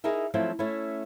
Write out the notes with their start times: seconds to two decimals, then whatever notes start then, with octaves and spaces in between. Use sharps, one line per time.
0.04 D#4 E4 G#4 A#4 D#5 E5
0.34 F3 F#3 A3 C4 E4 F4
0.59 A3 C#4 E4